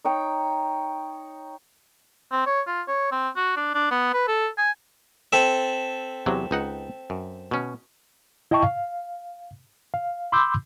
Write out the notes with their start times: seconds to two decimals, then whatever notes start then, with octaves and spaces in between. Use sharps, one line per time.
0.05 D#4 C#5 G5
2.32 C4
2.46 C#5
2.67 F4
2.88 C#5
3.12 C4
3.36 F#4
3.56 D4
3.75 D4
3.91 B3
4.13 B4
4.28 A4
4.58 G#5
5.33 C4 A4 E5
6.26 E2 C3 F#3
6.51 C#2 D#4 F#5
7.10 F#2
7.51 B2 C#4
8.51 E4 D#5 E5 G5 A5 C#6
8.63 F5
9.94 F5
10.32 B5 C6 D6 E6 G6